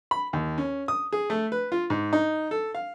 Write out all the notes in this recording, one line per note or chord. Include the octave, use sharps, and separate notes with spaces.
B5
D#2
C#4
D#6
G#4
A3
B4
F4
G#2
D#4
A4
F5